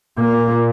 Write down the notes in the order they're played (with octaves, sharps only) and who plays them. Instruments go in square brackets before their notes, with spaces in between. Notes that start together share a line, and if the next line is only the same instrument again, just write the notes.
[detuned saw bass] A#2 [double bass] A#3